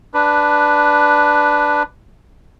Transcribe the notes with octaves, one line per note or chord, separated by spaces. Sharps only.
D4 B4